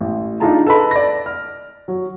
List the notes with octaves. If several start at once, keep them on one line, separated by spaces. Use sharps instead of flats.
A1
D4 D#4 F4 G#4 A5 A#5
A4 B4 D#5 B5
D5 A#6
F6
F#3